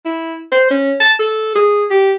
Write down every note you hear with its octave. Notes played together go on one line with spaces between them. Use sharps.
E4
C5
C#4
A5
A4
G#4
G4